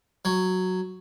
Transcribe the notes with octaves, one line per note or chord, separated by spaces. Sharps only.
F#3